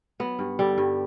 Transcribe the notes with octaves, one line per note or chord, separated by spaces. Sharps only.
F#3 B3
G2
D3 G3
G2